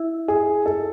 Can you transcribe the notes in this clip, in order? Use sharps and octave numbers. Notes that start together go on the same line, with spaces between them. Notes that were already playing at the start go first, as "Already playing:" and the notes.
Already playing: E4
G#4
A4